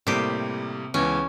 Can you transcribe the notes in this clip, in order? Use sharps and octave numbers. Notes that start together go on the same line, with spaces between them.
A2 C3 G3 A#3 G4
C#2 E3 B3 C#4